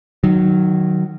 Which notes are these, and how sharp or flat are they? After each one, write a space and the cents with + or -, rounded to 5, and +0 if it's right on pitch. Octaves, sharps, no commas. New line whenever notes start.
D#3 -20 F#3 +0